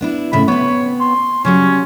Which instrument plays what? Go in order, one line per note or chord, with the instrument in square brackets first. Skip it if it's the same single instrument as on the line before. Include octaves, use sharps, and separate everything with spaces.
[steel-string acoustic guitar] B3 D4 E4
[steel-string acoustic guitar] A2 C#3 E5 [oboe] B5
[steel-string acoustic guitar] B3 C4 [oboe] C#5
[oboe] C6
[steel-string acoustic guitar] C#3 F#3 G3 [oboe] C#4